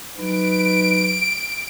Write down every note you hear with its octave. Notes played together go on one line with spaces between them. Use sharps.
F#3 D#4 B4 D7